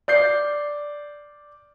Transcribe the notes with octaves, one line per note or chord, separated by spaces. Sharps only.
D5 G6 C7